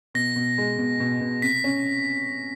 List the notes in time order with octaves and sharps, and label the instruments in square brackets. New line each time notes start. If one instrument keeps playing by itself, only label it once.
[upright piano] B2 [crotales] A#6
[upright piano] B2
G#3
B2
B2
B2
[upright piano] C3 [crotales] B6
[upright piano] C#4